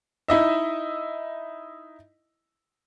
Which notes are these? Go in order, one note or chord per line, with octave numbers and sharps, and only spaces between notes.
D#4 E4 D#5 E5